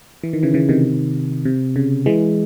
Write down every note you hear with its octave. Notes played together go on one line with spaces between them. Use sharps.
E3
D#3
C#3 E3
C#3 E3
C3 D#3
C3
C#3
E3 G#3